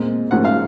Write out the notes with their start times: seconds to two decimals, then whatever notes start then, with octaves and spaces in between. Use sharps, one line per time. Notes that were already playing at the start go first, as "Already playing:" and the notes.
Already playing: A#2 G#3 C4
0.31 G#2 F3 A#3 C#4 F#5
0.45 F5